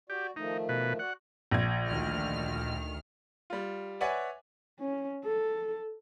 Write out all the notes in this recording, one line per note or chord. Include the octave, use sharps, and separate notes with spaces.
F#4 G4 D5
D#3 F3 A3 D#4
B2 B4
F#4 D5 F#5
A#1 G#6
D2 D#3 F6
G3 F4
B4 C#5 D5 E5 F#5 G#5
C#4
A4